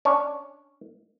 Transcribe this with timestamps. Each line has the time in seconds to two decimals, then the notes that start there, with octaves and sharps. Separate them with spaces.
0.05 C#4 D4 C#5